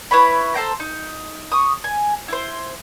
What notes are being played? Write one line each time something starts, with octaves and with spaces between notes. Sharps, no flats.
E4 B4 C#5 B5
A4 C5 G5 A#5
D#4
C#6 D#6
G#5
E4 C5